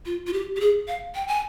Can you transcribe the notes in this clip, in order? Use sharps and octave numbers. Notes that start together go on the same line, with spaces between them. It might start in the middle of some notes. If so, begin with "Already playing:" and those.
F4
F4
G4
G4
G#4
F5
G5
G#5